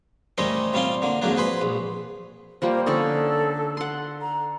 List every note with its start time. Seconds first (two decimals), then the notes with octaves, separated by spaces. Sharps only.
0.38 D#3 G3 A3 C#4 C5 D#5
0.73 C3 G3 C#4 F4 F5 C6
1.02 D3 A#3
1.22 F2 G#2 F#3 A#3 D4
1.36 G#4 B4 C5 B5
1.61 A#1
2.62 F3 G3 A#3 C5
2.86 D3 C#4 D#4 A4
3.77 F#5 C6
4.21 A#5